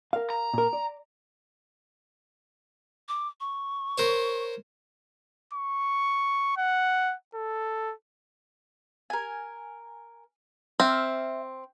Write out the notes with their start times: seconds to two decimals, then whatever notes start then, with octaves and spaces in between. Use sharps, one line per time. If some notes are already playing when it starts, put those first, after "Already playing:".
0.13 A#4 F5
0.30 A#5
0.54 A#2 A#4
0.73 D5
3.08 D6
3.40 C#6
3.98 A#4 C5 C#5
5.53 C#6
6.57 F#5
7.35 A4
9.10 A#4 G#5
10.80 C4 E5 F6